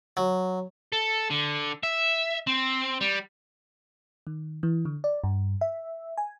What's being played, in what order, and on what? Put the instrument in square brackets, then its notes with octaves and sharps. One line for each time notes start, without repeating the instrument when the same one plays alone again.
[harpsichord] F#3
[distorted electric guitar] A4
D3
E5
C4
G3
[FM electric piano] D#3
E3
D3
D5
G2
E5
G#5